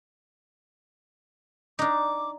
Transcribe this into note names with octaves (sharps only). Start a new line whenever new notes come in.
D4 D#4 D6